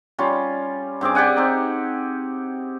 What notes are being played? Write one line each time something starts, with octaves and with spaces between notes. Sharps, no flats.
G3 C#4 F4
G2 C4 G#4 D6
G4 D5 F#5 G#5
C4 D#4